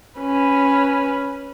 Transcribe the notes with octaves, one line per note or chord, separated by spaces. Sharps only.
C#4 B4